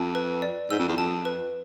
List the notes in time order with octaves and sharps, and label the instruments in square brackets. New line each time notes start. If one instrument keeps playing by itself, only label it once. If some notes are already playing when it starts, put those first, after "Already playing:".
Already playing: [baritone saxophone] F2 [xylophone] A5
[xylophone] B4
D5
[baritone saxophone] G#2 [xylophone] E6
[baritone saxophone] F2
E2
[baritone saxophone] F2 [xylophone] A5
[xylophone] B4